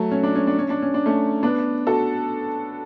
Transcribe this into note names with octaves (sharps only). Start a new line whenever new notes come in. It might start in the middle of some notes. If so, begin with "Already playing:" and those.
Already playing: F#3 A3
C#4
D4
C#4
D4
C#4
D4
C#4
D4
A3 C#4
B3 D4
F#4 A4